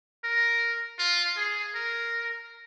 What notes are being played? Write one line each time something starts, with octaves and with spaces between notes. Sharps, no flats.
A#4
F4
G#4
A#4